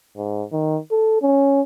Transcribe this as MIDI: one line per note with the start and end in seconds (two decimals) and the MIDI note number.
0.17 0.44 44
0.52 0.78 51
0.91 1.19 69
1.22 1.61 61